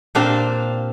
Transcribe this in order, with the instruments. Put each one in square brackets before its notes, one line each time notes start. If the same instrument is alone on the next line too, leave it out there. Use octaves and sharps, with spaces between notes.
[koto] A#2 C4 D4 G4 C5 F5